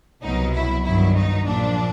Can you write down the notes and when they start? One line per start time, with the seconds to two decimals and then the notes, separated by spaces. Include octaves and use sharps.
0.22 C2 B2 F#3 D#4
0.54 E4
0.84 G1 G2 D#3 F#3 E4
1.15 D#4
1.45 A#1 A#2 F3 D4